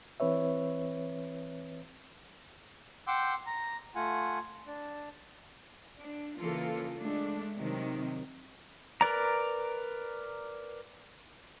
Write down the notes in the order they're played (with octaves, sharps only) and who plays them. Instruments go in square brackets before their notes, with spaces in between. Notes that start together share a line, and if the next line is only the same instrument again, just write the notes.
[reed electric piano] E3 C4 B4 C#5 E5
[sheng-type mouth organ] F#5 G5 C6 D6 E6 G6
A#5
A3 F4 F#5 G#5
D4
[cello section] D4
C#3 E3 A#3 F4 A4
G#3 A3 D4
C3 D#3 F#3
[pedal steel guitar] A#4 B4 D5 A#5